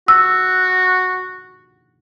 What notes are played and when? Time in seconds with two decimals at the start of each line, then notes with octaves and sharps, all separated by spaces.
0.08 F#4 E6